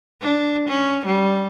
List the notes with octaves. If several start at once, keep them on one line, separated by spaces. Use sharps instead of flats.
D4
C#4
G3